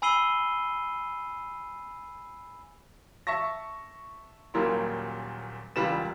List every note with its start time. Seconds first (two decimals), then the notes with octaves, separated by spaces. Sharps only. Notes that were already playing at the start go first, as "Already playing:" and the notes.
0.02 G#5 B5 E6 C7 D#7 G7
3.27 E5 A5 C#6 A#6
4.54 D#1 A#2 F#3 G3 A#4 C6
5.76 E1 C#2 G3 F4 B4 E7